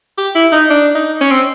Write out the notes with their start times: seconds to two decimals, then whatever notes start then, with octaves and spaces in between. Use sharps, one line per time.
0.18 G4
0.35 E4
0.52 D#4
0.70 D4
0.95 D#4
1.21 C#4
1.31 C4